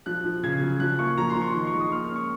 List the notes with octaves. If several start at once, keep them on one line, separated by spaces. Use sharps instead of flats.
F3 F#6
F3
C#3 G#6
F#3
F3 F#6
A#3 C#6
F3 A#5
C6
F3
C#6
D#3 C6
C#6
G#3
D#6
A#3 F6
F6
C#4
C#6